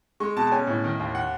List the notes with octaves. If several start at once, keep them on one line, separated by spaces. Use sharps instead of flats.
G#3 C#6
B2 A5
A5
C#4 G#5
A2
D#3
D#2
F#5